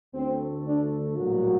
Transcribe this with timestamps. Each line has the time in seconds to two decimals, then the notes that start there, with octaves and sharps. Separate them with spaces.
0.14 D2 D3 A3 C4
0.65 D4
1.17 A#1 A2 F#3 G3 A#3 F#4